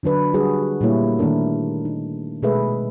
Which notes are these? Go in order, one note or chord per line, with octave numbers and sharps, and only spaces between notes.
D3 F#3 D4 B4
G3 F#4 G#4 B4
A#2 G3 A3 A#3 E4 C#5
D#3 A3 A#3 D4 A#4
D#4
B2 G#3 A3 G#4 B4 E5